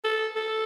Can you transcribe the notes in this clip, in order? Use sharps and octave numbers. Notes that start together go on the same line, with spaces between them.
A4
A4